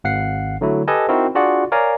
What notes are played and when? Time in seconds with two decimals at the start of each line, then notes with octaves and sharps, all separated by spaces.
0.04 G#1 F5 F#5 C7
0.61 D3 F#3 A3 E4
0.88 G4 A4 B4 D#5 G#5 A5
1.09 C4 D#4 E4 F#4 A#4
1.35 D4 F4 F#4 G#4 D5 F#5
1.72 A#4 C#5 D5 F5 G#5 A#5